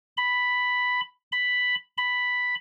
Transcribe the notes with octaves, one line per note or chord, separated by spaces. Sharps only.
B5
B5
B5